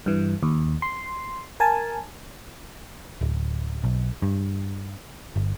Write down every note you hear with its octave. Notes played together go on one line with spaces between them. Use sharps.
G2 E3
D#2
C6
A#4 G#5 A5
D1
B1
G2
G1